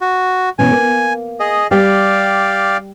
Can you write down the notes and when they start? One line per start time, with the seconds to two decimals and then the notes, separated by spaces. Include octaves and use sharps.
0.01 F#4
0.59 B2 E3 C#4 G#5
0.71 A#3
1.40 G#4 D#5
1.71 G3 G4 D5 F5 G5